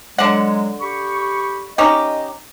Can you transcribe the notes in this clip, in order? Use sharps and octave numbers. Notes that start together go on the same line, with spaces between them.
D3 F#3 G#3 F#5
G4 B5 C#6
C#4 D#4 G4 D#5